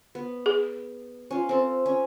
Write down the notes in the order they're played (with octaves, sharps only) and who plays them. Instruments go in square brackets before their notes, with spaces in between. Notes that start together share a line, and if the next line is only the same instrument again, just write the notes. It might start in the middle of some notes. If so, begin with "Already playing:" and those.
[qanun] B3
[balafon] G#4
[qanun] C#4 F4
C4 A4
C#4